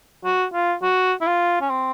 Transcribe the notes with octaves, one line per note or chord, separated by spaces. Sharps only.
F#4
F4
F#4
E4
F4
C#4
C4